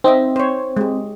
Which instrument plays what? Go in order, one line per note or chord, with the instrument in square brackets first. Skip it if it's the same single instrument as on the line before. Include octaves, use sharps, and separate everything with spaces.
[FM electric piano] C4 [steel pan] D#4 D#5 E5
[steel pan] C5 C#5
G#3 G4